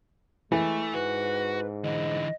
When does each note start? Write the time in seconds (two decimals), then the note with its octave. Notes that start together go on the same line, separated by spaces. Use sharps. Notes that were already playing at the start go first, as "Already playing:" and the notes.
0.52 E3 G#3 A3
0.94 G#2 F#4 B4
1.84 D3 E3 D#5